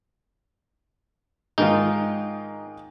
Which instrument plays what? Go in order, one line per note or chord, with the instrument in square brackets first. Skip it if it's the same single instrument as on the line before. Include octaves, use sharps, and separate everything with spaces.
[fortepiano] G#2 D#3 F4 [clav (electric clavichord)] D#4